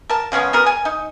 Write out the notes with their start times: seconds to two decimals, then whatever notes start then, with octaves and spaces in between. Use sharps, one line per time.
0.10 A#4 A5
0.32 C#3 G#3 B3 C#4
0.53 B3 F#4 G#4 A#4
0.66 G#5
0.85 D#4